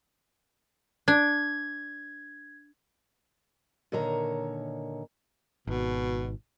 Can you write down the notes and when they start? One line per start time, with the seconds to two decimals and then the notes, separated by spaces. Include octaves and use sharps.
1.08 D4 G#6
3.92 A#2 D3 D#3 C#5 A#5
5.67 G#1 B2